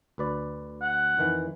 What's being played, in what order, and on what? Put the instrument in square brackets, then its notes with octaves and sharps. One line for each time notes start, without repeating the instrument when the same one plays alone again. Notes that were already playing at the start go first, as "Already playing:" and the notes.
[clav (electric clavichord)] D2 B4 D5
[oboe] F#5
[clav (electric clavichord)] F2 D#3 E3